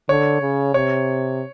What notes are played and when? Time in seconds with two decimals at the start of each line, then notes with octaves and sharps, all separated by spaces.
0.09 D3 C#5
0.42 C#3
0.74 C3 C#5